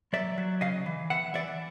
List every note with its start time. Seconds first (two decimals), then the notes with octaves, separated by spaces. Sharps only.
0.13 F#3 D5 E5
0.38 F#3
0.61 C#3 D#5 F5
0.86 E3
1.10 E3 E5 F#5
1.34 E3 D5 E5